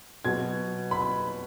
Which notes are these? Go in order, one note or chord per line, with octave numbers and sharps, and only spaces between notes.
B2 F#3 G#6
B5